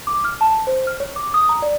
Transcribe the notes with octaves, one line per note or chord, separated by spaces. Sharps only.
D6
F6
A5
C5
F6
C#5
D6
D#6
A#5
D5